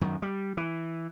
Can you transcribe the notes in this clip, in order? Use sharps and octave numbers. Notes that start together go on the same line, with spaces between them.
F#2 D#3
G3
E3